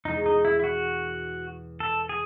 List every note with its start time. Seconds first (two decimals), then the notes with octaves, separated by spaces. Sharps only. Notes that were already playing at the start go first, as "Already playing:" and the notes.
0.05 E2 B2 G#3 C#4 D#4
0.26 D#4
0.45 E4
0.59 E4
0.64 F#4
1.80 A4
2.09 G#4